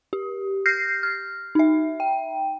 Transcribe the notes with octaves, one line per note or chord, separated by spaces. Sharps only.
G4
F6 G6 A#6 C7
F6
D#4 E5
G5